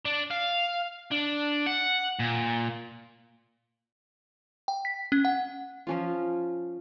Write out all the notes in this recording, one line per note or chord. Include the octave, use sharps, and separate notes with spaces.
D4
F5
D4
F#5
A#2
G5
B6
C#4
F#5
F3 C#4 F4